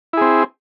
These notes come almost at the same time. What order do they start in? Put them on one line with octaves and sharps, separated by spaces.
E4 G#4 C4